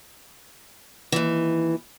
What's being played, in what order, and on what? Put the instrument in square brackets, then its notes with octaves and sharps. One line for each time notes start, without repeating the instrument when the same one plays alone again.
[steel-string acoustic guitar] D#2 E3